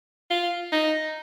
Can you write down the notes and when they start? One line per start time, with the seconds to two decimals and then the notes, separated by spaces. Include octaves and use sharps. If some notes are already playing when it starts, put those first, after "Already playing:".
0.30 F4
0.72 D#4